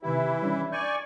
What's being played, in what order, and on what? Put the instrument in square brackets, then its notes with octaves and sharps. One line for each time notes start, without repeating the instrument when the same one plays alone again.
[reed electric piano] C3 D#3 G4 [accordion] E3 E4
[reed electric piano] G3 C#4 D4
[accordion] D5 G#5 C#6 [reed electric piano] G6 G#6